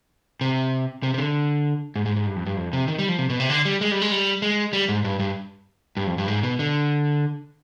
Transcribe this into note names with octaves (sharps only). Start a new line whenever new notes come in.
C3
C3
C3
D3
G#2
G#2
G#2
G2
F2
G2
F2
C3
D#3
G3
F3
C3
B2
C3
D3
G3
G#3
G3
G#3
G3
G#3
G3
G#2
G2
G2
G2
F2
G2
G#2
B2
D3